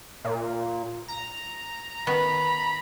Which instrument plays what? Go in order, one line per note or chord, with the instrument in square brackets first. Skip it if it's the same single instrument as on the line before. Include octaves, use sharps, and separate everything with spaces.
[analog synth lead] A#2
A#5
[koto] D#3 B3 [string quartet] B5